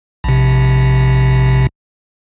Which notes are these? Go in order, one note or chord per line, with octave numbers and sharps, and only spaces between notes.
A#1 C3